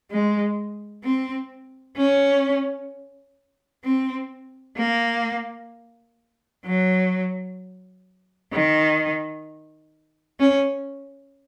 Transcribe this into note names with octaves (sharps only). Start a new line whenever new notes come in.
G#3
C4
C#4
C4
A#3
F#3
D#3
C#4